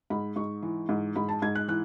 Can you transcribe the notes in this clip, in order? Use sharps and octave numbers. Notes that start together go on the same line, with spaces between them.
G#2 B5
G#2 C#6
E3
G#2
G#2 B5
A5
G#2 G#6
F#6
E3 F#6